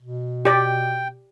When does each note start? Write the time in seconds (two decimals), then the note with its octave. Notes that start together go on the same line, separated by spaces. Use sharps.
0.02 B2
0.45 G4 D5 G5